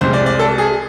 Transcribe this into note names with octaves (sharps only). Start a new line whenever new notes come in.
C2 C3 G#3 C5
D5
D5
A4
G#4